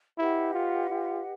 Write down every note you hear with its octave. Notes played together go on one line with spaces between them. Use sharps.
E4 G4 B4 D#5 F#5
F4
F4